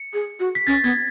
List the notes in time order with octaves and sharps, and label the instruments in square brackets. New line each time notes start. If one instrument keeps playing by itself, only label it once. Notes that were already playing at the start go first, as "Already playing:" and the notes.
Already playing: [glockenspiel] C#7
[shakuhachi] G#4
F#4
[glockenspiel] B6
[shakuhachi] C#4 [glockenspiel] A6
[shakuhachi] B3 [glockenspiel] G#6